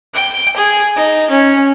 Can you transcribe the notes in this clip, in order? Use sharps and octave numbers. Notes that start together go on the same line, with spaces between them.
G5
G#4
D#4
C#4